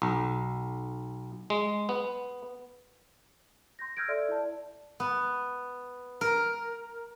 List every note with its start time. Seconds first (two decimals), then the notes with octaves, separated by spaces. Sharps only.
0.02 B1
1.50 G#3
1.89 B3
3.79 C6 G6 A#6
3.97 E6 F6 G6 G#6 A#6 D7
4.08 A4 D5 E5 C6
4.28 E4 D5 A5
5.00 B3
6.21 A#4